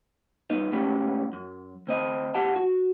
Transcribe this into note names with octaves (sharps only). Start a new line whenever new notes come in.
G2 B3 D#4
G#2 B2 A3 B3 C#4 G4
F#2
D2 C4 D#5
B1 G4 F#5 A5
F#4